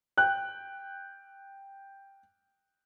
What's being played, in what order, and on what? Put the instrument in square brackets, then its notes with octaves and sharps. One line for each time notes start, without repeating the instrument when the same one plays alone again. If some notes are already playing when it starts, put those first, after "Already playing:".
[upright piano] G5 F#6